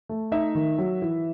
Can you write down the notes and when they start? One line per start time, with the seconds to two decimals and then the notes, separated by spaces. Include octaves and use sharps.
0.09 A3
0.32 D#4 E5
0.55 D#3
0.78 F#3
1.02 E3